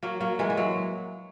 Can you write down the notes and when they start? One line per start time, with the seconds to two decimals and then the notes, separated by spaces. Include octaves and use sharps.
0.03 F#3 A#3
0.21 F#3 A#3
0.39 E3 G#3
0.50 E3
0.57 F#3